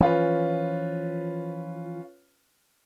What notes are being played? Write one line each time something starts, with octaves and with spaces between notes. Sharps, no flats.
E3 F3 C#4 F4 B4